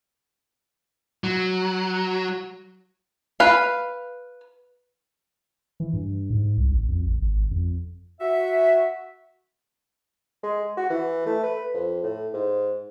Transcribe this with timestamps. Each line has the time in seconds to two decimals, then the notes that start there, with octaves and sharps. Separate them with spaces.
1.24 F#3
3.40 B4 F5
5.80 E3
5.93 G2
6.30 G#2
6.57 C2
6.72 A1
6.88 F2
7.06 A1
7.22 G#1
7.51 F2
8.20 F#4 E5
10.43 G#3
10.77 F#4
10.90 E3
11.26 A3
11.43 B4
11.74 F2
12.03 A2
12.33 G#2